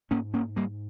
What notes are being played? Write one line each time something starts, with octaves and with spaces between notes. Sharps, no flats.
G#2 A#3 C#4
A#3 C#4
G3 A#3